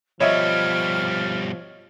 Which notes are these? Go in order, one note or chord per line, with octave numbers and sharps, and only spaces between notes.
B2 F3 G3 C#5 D#5 E5 F6